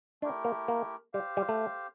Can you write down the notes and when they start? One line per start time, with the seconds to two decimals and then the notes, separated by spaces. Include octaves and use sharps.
0.22 A3 D4 E4 G4 A#4
0.45 A#3
0.68 A#3
1.13 G3 G4 C5 F5
1.37 G3
1.49 A3